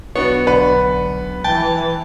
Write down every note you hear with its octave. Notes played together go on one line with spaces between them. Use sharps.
B1 B3 D4 F#4 C#5
D3 B4
E3 G5 A5